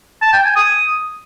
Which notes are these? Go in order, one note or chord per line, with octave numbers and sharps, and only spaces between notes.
A5
G5
G#5
D#6